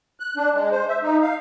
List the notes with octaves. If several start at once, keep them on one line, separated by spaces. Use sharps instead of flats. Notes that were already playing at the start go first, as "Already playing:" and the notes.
F#6
D4
G#3
C5
E5
D#4
F5